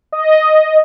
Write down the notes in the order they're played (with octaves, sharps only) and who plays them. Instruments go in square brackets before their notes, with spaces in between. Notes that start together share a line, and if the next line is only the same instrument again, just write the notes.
[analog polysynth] D#5